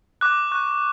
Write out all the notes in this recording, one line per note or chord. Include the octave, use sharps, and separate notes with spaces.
D6 F#6
C#6 F#6